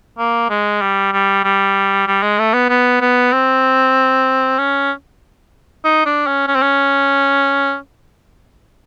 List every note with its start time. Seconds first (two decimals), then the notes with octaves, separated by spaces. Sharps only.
0.18 A#3
0.50 G#3
0.81 G3
1.12 G3
1.44 G3
2.07 G3
2.22 G#3
2.38 A3
2.53 B3
2.69 B3
3.01 B3
3.32 C4
4.58 C#4
5.84 D#4
6.06 D4
6.26 C#4
6.47 C#4
6.55 C4
6.62 C#4